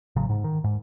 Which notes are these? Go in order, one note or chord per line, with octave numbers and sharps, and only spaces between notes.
A1 C#3 F#3
G#2
D#3
G#2